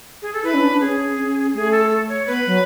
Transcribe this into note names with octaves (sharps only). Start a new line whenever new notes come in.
G#4
A4
E4 B4
C#4
D4
C#4 G#4
C#4
A3 G#4
A4
A4
C#5
B3 B4
F#3